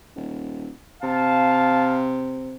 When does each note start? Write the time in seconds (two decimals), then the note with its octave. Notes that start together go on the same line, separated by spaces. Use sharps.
0.16 D#1
1.03 C3 F5 A5